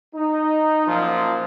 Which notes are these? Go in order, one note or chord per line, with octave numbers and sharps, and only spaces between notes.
D#4
F#2 A#2 F3